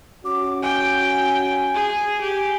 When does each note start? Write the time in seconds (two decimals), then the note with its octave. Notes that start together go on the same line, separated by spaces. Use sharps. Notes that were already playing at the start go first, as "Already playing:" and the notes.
0.25 C#4 F#4 D6
0.62 G5 G#5
1.74 G#4
2.21 G4